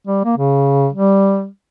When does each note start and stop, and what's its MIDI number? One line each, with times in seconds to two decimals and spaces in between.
0.07 0.20 55
0.25 0.36 58
0.37 0.88 49
0.93 1.47 55